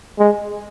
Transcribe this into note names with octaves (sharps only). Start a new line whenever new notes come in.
G#3